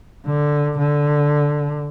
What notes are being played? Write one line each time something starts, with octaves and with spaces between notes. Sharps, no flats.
D3
D3